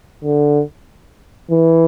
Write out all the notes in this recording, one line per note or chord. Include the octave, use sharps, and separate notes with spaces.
D3
E3